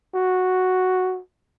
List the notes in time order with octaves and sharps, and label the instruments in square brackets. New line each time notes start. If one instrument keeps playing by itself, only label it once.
[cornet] F#4